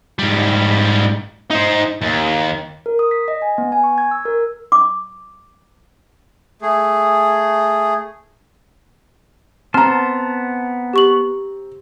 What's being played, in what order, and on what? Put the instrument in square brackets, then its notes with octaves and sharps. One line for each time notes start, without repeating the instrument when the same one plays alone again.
[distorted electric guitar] G#2 G3
D#4 C5
D#2
[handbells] A#4
D#6
B6
D#5
G#5
B3
G#5
C#6
G#6
E6
A#4
[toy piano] D6
[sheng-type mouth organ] A3 G#4
[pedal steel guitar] B3 A5 C6 [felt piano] C4 A#5 [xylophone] F6
[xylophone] G4 C#6 F#7